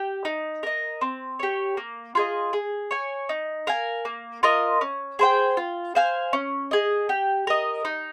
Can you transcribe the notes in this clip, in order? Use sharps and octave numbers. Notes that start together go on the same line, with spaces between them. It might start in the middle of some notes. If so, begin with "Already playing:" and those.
Already playing: G4
D#4
A#4 D#5
C4
G4 C#5
A#3
F4 G#4 D#5
G#4
C#5 G#5
D#4
A#4 F5 G#5
A#3
F4 A#4 D#5
C#4
G#4 C5 G5
F4
C5 F5 G#5
C#4
G#4 D#5
G4
A#4 D#5
D#4